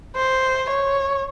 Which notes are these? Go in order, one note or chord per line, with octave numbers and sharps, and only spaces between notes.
C5
C#5